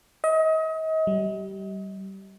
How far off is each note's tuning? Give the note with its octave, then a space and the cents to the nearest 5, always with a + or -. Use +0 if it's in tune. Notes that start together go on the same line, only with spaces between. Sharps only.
D#5 +35
G3 -20